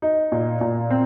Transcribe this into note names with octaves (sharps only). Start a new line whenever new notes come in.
D#4
A#2
A#2
C4